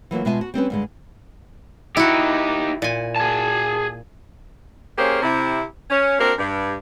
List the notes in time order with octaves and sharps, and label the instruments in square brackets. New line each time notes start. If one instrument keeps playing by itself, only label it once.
[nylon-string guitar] E3 F#3 A#3 F4
B2 G#3 F4 E5 G#5 A5
F#4
G3 C4 C#4 B4
G2 D3 G#3
[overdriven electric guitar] D#4 G4 [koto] E4 F#4
[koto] A#2 G#5
[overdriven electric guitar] G#4 A5
[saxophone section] A#3 C#4 G4 G#4 C5
C3 E4
C#4
A#3 C4 D4 F#4 A#4
G2